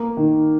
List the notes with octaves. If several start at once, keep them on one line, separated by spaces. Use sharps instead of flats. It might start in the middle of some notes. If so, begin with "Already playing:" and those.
Already playing: A#3
D#3